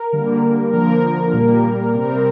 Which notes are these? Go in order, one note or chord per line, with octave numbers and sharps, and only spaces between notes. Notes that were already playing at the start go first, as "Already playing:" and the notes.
Already playing: A#4
D3 G3 A#3
D3 F3 A#3 A#4
A#2 G3 A#3
C3 G3 C4 A#4